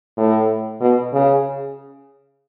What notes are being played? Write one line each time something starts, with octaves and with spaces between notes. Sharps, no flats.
A2
B2
C#3